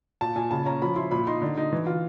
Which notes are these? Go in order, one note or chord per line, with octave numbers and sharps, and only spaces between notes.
A#2 A5
A#2 G#5
C#3 A5
C#4 A#5
F3 B5
E4 C6
A#2 B5
D#4 C6
D3
D#4
E3
F4